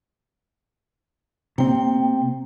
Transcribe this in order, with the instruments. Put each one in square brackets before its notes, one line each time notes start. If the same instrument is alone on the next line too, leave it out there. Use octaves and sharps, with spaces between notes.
[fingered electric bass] C3 C4 [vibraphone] A#3 G5